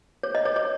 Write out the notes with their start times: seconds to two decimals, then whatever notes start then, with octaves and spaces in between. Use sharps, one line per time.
0.23 C#5
0.35 D#5
0.45 C#5
0.56 C#5